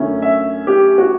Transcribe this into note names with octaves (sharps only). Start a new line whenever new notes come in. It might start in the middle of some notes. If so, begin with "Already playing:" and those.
Already playing: F#2 D3 A3 C#4
E5
G4
F#4